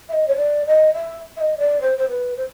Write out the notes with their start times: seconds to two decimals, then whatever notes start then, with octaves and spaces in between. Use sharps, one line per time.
0.09 E5
0.13 D#5
0.28 C#5
0.37 D5
0.66 D#5
0.94 E5
1.37 E5
1.40 D#5
1.58 D5
1.81 C5
1.98 C5
2.09 B4
2.37 C5